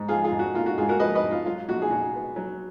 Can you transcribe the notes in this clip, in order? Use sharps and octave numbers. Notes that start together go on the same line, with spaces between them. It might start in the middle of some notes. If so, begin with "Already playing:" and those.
Already playing: G#2
F3 F4 G#4
F4 G#4
G#2
F#4
A#3 F4
F#4
G#2 F4 G#4
F#4 A#4
F3 B4 D#5
B4 D#5
G#2
F4
F#3 F4
A#1 F#4
G#4
A#2 F#4
B3
F#3